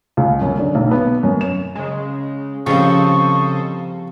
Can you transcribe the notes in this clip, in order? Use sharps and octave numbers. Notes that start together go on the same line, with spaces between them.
C#2
F#2
D3
B1
B3
F#2
E7
C#3 G#3
C2 C#3 F3 A4 C5 D#5 C#6